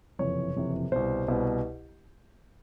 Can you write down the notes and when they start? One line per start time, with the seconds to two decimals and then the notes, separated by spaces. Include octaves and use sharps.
0.19 F#1 F2 C3 E3 C#5
0.56 F#1 F2 C3 E3
0.92 C2 B2 C5
1.28 C2 B2